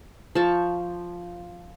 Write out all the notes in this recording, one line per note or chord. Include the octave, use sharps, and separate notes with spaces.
F3 A5 C#6